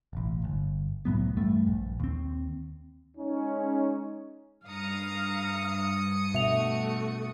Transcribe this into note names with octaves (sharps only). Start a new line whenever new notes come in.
E1 A1
G1
C2 A2 F#3 B3
E2 G2 A3
A#1
D#2 C4
G#3 C#4 D#4
G2 F5 A#5 D#6 C#7
B2 A3 F#4 E5 F7